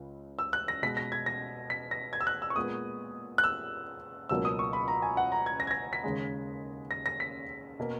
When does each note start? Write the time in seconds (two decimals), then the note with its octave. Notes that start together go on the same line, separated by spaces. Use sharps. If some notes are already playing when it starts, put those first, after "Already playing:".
Already playing: C#2 C#3
0.39 E6
0.53 F#6
0.68 A#6
0.82 B2 G#3 B3 B6
0.97 A#6
1.12 G#6
1.26 A#6
1.70 B6
1.91 A#6
2.13 G#6
2.21 E6
2.27 F#6
2.42 E6
2.50 C#6
2.56 A#2 G#3 B3 D#6
3.38 F#6
3.44 E6
4.29 C#2 B2 F#3 A#3 E6
4.45 D#6
4.59 C#6
4.73 B5
4.88 A#5
5.02 G#5
5.17 F#5
5.32 A#5
5.46 G#6
5.60 A#6
5.67 G#6
5.71 A#6
5.93 B6
6.04 D#2 C#3 G#3
6.91 A#6
7.06 A#6
7.20 B6
7.80 B2 A#3